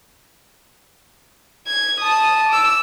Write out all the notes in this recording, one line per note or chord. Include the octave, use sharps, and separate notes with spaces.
G#6
A5 D#6
D6 E6